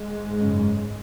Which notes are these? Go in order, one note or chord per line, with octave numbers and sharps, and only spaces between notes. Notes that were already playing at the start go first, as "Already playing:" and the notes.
Already playing: G#2 G#3
F#2 C#3